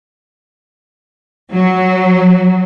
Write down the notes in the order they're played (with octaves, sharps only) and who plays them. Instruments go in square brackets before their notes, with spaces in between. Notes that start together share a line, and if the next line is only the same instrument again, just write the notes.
[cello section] F#3